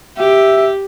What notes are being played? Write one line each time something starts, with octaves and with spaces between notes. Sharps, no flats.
G4 E5